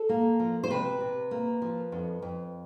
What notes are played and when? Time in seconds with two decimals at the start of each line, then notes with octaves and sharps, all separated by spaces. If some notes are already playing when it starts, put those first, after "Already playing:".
Already playing: A4
0.09 A#3
0.40 F3
0.64 C5
0.70 C3 B4
1.01 C3
1.31 A#3
1.62 F3
1.92 F2
2.22 F2